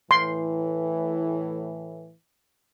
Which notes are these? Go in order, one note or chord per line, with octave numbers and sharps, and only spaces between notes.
A2 E3 C6